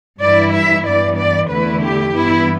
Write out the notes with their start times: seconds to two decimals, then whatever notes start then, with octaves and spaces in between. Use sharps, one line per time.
0.21 G2 E3 G3 E4 D5
0.54 E5
0.85 G2 E3 B3 D5
1.17 D5
1.50 E2 D3 A3 E4 B4
1.83 G4
2.14 G2 E3 B3 E4